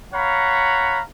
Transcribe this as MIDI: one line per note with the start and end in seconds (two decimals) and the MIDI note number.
0.14 1.00 73
0.14 1.00 77
0.14 1.00 78
0.14 1.00 82
0.14 1.00 83